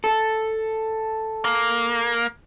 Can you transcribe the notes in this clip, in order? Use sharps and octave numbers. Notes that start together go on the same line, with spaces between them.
A4
A#3